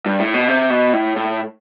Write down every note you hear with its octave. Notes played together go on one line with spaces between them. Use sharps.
G2
A2
B2
C3
B2
A2
A2